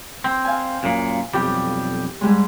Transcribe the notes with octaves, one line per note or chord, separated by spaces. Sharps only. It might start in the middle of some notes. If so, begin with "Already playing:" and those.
C4
F5 G#5
F#2 A#2
B1 F2 G3 G4
G#2 G3 G#3